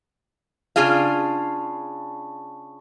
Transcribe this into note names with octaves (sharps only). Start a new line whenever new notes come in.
C#3 D4 F4 G#4 F5